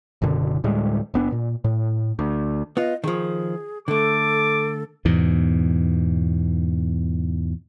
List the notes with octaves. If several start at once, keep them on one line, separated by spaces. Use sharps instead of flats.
F#1 F#2 B2 D3
D2 A2 G3 G#3
F#1 B3 D4
A#2
A2
D2
B3 F4 D#5
D#3 F3 G#4
D3 A3 A4 D6
E2 G#2 B2